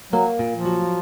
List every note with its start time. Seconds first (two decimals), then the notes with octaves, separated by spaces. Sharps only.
0.12 F#3 A#3
0.39 A#2
0.52 F3
0.65 F#3